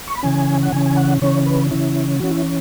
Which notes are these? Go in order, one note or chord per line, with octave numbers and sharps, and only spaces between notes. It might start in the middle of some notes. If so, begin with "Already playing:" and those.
C#6
B5
C#3 E3 C#4 G#5
F#5
C#3 E3 C#4 G#5
G#5
F#5
C#3 E3 C#4 C#5
B4
C#3 E3 C#4 E4
E3 C#4 F#4
E4